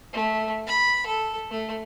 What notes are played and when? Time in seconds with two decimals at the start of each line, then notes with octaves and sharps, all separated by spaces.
0.13 A3
0.67 B5
1.06 A4
1.51 A3